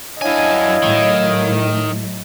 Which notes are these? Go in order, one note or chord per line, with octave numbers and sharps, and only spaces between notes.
F#2 D4 E4 C#5 D#5 F5 G#5
A2 D#3 F#3